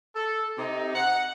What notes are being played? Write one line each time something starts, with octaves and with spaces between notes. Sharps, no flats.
A4
C3 D#4
F#5